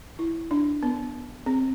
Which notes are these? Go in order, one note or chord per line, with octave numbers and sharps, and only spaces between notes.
E4
D4
B3
C4